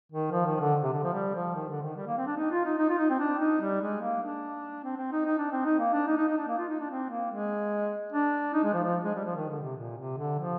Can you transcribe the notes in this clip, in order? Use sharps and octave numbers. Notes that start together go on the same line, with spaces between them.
D#3
F3
D#3
D3
C3
D3
F3
G3
F3
D#3
D3
D#3
G3
A#3
C4
D4
D#4
F4
D#4
D#4
F4
D#4
C4
D4
D#4
G3
G#3
A#3
D4
C4
C4
D#4
D#4
D4
C4
D#4
A#3
D4
D#4
D#4
D#4
D4
A#3
F4
D#4
D4
C4
A#3
G#3
D4
D#4
G#3
F3
F3
G#3
G3
F3
D#3
D3
C3
A#2
C3
D3
F3